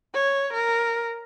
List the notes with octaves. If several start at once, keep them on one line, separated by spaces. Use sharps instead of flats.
C#5
A#4